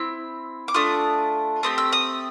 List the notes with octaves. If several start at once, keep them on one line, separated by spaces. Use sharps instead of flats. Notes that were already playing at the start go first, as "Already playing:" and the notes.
Already playing: C4 E4 E6
D6
A3 D4 F4 D#6
A3 C4 G4 D#6
E6
D#6